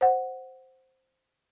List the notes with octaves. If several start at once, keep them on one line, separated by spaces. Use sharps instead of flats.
C5 F#5